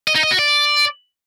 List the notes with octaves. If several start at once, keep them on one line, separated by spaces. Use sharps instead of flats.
D#5
D#4
D#5
F#4
D5